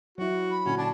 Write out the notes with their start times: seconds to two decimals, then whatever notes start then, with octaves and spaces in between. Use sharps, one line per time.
0.18 F#3 E4 F#4
0.51 B5
0.66 A#2 D3 C#4 F#4
0.78 D4 A5